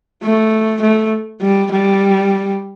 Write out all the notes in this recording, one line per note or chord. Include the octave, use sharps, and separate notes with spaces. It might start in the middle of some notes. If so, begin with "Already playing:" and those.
A3
A3
G3
G3